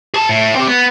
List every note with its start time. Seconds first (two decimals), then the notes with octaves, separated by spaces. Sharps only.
0.14 G#4 A5
0.29 A2
0.55 C4 G4
0.68 B3